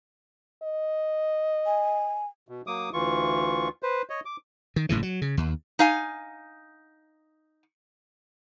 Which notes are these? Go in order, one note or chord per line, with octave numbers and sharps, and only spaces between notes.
D#5
G#5
B2
F#3 A#3 D6 D#6
D2 E3 F4 C#6
B4 C5
C#5 D#5
D6
D#3
F#1 A2 C#3 E3
F#3
C#3
D#2
D#4 F5 G#5